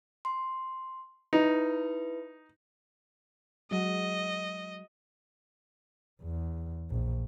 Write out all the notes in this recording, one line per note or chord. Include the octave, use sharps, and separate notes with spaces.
C6
D#4 E4 B4
F#3 G#3 G#4 D#5
E2
A#1